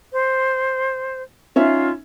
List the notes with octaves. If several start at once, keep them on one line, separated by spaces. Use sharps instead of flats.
C5
C#4 D#4 F4 E5